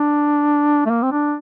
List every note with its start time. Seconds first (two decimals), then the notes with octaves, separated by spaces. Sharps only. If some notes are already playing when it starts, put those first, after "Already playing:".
Already playing: D4
0.86 A3
0.91 A#3
1.03 C4
1.12 D4